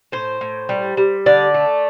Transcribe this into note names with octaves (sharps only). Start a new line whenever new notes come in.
A2 C5
A2
G3
G3
D3 D5
A3